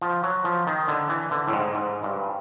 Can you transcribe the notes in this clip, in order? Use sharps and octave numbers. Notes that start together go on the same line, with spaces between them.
F3
F#3
F3
D#3
D3
E3
D3
A2
G#2
G#2
G2